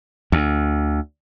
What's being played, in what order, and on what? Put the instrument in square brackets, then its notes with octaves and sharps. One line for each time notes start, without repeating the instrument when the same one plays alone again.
[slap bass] D2